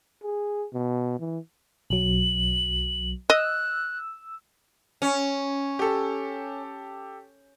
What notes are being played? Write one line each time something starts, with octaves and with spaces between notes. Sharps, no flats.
G#4
B2
E3
B1 F#3 F#7
D#5 E6 F#6
C#4
G4 A4